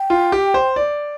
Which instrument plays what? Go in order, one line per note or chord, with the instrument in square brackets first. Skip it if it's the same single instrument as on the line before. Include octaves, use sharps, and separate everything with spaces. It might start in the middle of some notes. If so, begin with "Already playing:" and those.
Already playing: [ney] G5
[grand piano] F4
G4
C5
D5